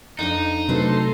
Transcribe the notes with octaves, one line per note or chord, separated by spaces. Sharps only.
F2 D4 D#4
C3 F#3 A3 D4 A4 B4 C5 C6